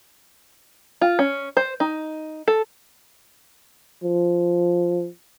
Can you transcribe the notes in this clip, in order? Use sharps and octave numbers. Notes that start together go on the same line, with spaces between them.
F4
C#4
C5
D#4
A4
F3